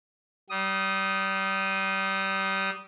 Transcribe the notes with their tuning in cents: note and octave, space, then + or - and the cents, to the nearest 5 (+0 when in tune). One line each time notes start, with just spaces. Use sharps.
G3 -30 D#6 +0